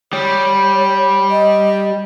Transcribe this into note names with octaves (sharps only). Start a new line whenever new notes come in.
G3 C#5
D#5